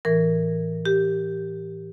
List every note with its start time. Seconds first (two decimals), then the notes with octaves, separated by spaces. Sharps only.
0.05 A2 E3 A#4
0.85 G4